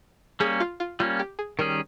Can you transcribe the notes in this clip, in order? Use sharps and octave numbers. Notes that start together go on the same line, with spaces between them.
G3 A#3 C#4 G#4
F4
F4
G3 A#3 C#4 F4
G4
G#4
D#3 G3 C#4 G#4 A#4